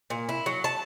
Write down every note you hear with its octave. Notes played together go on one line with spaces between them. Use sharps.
A#2
E4
F#3
A5